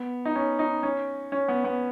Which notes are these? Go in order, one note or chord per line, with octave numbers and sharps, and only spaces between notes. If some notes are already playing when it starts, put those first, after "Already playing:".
Already playing: B3
D#4
C#4
D#4
C#4
C#4
B3
B3